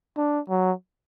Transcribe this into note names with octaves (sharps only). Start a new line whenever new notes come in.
D4
F#3